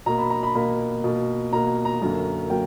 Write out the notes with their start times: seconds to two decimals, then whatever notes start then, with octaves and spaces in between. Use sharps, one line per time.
0.06 B2 A#3 A#5
0.18 B5
0.30 A#5
0.43 B5
0.55 B2 A#3 B5
1.04 B2 A#3
1.53 B2 A#3 A#5
1.85 A#5
2.02 F#2 D3 F#3 A#3
2.50 F#3 A#3 G5